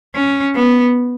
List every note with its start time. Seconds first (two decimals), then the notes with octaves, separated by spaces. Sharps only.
0.16 C#4
0.56 B3